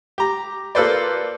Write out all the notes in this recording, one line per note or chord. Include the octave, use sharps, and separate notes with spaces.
G4 A#5
A#3 F4 A4 B4 C5 D5